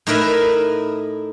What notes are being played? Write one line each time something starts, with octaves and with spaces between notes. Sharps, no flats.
A2 D#4 E4 A#4 B4 E5